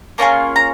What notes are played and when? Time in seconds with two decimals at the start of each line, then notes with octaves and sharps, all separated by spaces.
0.18 A#3 C#4 F4 G#4 A#5
0.56 A#5